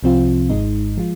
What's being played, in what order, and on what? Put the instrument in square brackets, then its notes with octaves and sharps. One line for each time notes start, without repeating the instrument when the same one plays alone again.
[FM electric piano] C2 C3 F3 C4 F4
G#1 G#2 G#3 D#4
F3 G#3 F4